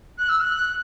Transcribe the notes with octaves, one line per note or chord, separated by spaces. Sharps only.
F#6
E6
F#6